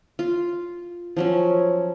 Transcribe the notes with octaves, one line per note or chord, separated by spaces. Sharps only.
F4
F3 F#3 C#4